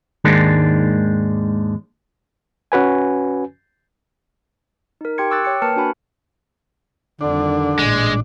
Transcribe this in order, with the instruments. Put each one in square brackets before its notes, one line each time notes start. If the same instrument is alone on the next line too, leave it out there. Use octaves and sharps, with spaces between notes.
[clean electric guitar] D#2 G#2 D#3 G#3 D4
[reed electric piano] C#4 F#4 B4 G#5
[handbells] D#4 A#4
G4 G5 C6 G#6 C#7
C#6 D6 E6 F#6 A6
C#5 G5 C#7
A#3 A#4 B4 A5 F6 C#7
D4 F#4 G#5 B5
[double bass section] F2 D#3 G3 [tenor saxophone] D3 [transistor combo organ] D4
[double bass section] A1 A#2 [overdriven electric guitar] G#3